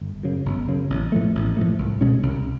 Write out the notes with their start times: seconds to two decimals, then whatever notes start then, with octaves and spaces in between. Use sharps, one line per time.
0.01 G1
0.23 F#2 C#3
0.45 G1
0.68 F#2 C#3
0.90 A1
1.12 A2 F3 A3
1.35 A1
1.57 A2 F3 A3
1.78 C2
2.01 B2 G#3 C#4
2.23 C2